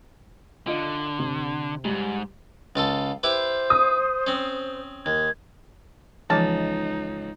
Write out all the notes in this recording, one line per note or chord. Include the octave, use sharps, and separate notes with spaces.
D3 F4 D#5
C3
G#2 G3
C#2 F4 A4 F5
E4 G4 B4 C5
D#6
C4 C#4
D#2 G#6
C#2 E3 F3 D#4 A5 D6